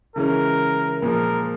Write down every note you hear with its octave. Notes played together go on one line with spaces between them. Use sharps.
C#3 E3 G#3 C#4 A#4
A#2 F3 G#3 A#4